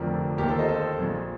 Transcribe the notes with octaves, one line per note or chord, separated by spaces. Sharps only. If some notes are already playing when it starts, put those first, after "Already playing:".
Already playing: F1 F2 D3 F3 A#4 D5
D#2 D#3 G4 A#4
A4 C5
C5 D#5
A4 C5
A#1 A#2 F3